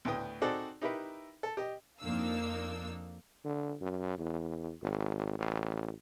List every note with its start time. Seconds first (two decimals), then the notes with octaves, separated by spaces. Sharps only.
0.05 D2 A2 B3 G5 D#6
0.42 C4 D#4 F#4 G#4 A4 D5
0.81 D#4 E4 G4 A#4 B4 E5
1.43 A4
1.57 G4 D#5
2.01 F2 A#3 D4 D#4 F5 E6
3.45 D3
3.81 F#2
4.18 E2
4.82 G#1
5.38 A1